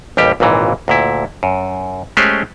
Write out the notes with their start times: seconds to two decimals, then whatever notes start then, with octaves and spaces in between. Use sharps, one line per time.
0.17 A1 D#2 G3 G4
0.40 G#1 C#2 A#2 E3
0.88 D2 A#2 E4
1.43 F#2
2.17 G#3 A3 C#4 G4 C5